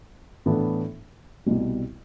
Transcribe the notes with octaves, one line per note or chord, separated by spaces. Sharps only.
A2 E3 B3 D4 A4
C2 B2 G3